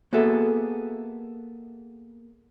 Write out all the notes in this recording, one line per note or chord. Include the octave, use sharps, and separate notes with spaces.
A#3 B3 F#4 G#4 A4 E5